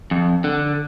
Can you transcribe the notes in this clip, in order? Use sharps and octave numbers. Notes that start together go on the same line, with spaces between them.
F2
D3